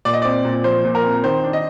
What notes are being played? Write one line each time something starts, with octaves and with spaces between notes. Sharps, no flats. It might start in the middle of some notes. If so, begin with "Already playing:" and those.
A#2 D5
D#5
C4 D5
A#2
F3 C5
A#2
A#4
C4
D#3 C5
D4
D#5